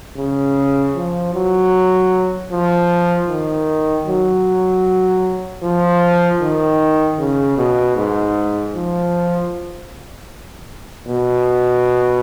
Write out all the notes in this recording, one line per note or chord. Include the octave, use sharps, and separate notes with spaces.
C#3
F3
F#3
F3
D#3
F#3
F3
D#3
C#3
B2
G#2
F3
B2